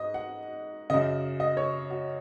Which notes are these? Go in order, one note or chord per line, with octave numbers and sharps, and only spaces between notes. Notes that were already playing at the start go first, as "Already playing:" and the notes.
Already playing: G#2 D#5
F#5
F#2 C#3 D#5
D#5
C#5
F#4